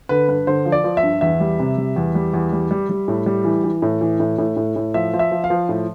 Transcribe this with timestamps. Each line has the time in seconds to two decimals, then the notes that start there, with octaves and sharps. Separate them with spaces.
0.09 D3 B4
0.28 G2 B4
0.47 D3 C5
0.65 F3
0.72 D5
0.84 F3
0.97 E5
1.03 G2
1.21 E2 E5
1.40 G3
1.59 C3
1.77 G3
1.96 E2
2.15 G3
2.34 E2
2.53 G3
2.71 G3
2.90 G3
3.08 A2
3.26 G3
3.45 E3
3.64 E3
3.82 A2
4.01 E3
4.20 A2
4.38 A2
4.57 A2
4.76 A2
4.94 F3 E5
5.13 F3
5.19 E5
5.31 F3
5.44 F5
5.50 F3
5.69 A2